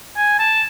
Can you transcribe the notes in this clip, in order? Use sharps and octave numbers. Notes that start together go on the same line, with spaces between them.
G#5
A5